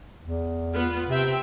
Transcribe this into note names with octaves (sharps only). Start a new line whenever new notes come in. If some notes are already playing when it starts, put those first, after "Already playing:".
E2
B3 F4
C3 C4 E5 G5